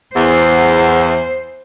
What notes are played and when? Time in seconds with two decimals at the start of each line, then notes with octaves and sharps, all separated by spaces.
0.15 E2 C5